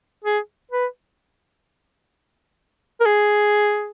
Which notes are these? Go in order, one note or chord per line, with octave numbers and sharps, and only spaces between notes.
G#4
B4
A#4
G#4